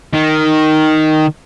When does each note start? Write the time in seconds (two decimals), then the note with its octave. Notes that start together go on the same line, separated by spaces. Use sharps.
0.14 D#3